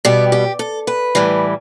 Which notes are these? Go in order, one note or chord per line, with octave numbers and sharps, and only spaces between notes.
B2 G3 B3 G4
G4
A4
B4
A2 E3 G3